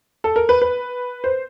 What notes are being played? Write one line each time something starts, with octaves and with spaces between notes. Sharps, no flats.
A4
A#4
B4
B4
C5